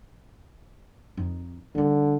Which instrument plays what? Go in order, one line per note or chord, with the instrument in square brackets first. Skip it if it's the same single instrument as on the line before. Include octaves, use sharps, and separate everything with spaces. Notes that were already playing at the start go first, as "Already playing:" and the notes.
[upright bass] F2 D#4
[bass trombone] D3 [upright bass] G3 D#4